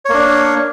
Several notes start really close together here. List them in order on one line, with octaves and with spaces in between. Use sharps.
C#5 A#3 D4